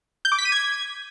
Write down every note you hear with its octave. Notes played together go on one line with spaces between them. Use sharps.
G6
D6
B6
D#7
G#6